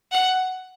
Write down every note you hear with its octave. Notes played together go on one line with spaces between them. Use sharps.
F#5